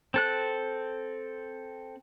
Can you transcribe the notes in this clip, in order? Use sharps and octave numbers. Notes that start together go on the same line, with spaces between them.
C4 A4 F#6